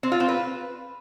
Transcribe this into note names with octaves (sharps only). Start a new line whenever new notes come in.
C4
F4
C4
B4